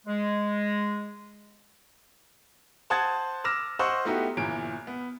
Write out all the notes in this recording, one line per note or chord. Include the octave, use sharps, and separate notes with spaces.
G#3
C5 F#5 A5 D#6 G#6 A6
D6 E6 F6 A#6 E7
C5 D#5 F#5 C#6 E6
A3 B3 D#4 E4 F#4 G4
G1 A#2 E3 D7
B3